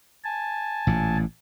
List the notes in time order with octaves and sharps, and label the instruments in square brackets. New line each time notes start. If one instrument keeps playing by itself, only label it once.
[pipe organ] G#5 A5
[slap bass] A1 A#2